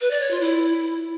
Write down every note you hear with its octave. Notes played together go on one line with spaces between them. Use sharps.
B4
D5
C#5
F4
E4